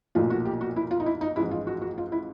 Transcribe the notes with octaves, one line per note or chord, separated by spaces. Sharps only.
B1 A#2 F3 A3 F4
F#4
G4
F#4
E4
F4
D#4
E4
D#4
A1 G#2 F3 G#3 E4
F4
F#4
F#4
F4
E4